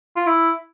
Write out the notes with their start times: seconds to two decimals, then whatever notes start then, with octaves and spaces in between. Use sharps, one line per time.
0.17 F4
0.27 E4